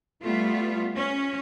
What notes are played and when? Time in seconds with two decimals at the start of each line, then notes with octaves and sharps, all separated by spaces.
0.22 G3 A3 B3 F4
0.95 C#4